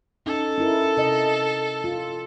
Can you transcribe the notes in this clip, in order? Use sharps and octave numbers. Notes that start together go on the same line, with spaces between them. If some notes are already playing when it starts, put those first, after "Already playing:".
C#4 D#4 A4
C#4 E4 A#4
C3 D#5
F4